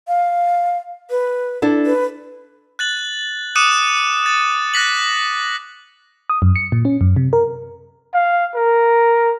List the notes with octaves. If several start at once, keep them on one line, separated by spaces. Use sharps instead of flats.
F5
B4
D4 E4 A4
B4
F#6 A6 F#7
D6 D#6 F#6 C#7 D#7 E7
A6
F#6 A#6 B6 F#7
D#6
F#2
C#7
A#2
C#4
F#2
C3
A#4
F5
A#4